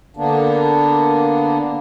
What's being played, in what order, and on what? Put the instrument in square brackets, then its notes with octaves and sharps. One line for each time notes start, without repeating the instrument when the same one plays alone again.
[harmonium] D3 A#3 B3 D4